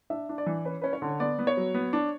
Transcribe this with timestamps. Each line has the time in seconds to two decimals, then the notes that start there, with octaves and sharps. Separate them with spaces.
0.10 D4 E5
0.29 D4
0.38 D5
0.46 E3
0.65 C#4 B4
0.82 C#4 B4
0.93 C#5
1.02 D3
1.20 B3 D5
1.39 B3
1.47 C#5
1.57 F#3
1.74 B3
1.93 D4